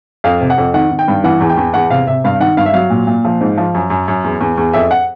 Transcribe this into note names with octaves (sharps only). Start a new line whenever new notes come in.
F2 F5
C3
F#5
F2
D#3 F#5
D#3
G5
G2
E3 F#5
E2
G5
E2
E2 F#5
C3 F5
C3 E5
G2 F5
D#3 F#5
G2 F5
E5
F#3 F5
A#2
A#2
F3
G#2
F3
F#2
F#2
F#2
E2
E2
E2
F2 E5
F#5